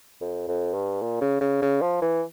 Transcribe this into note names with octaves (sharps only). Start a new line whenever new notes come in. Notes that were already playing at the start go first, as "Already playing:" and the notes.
F2
F2
G2
A#2
C#3
C#3
C#3
F3
E3